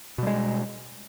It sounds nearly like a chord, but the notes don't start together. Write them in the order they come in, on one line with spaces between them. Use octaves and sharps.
B2 G3 G#3